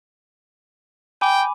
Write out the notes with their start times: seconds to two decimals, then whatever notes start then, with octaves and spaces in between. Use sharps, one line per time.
1.21 G5 G#5 B5 D6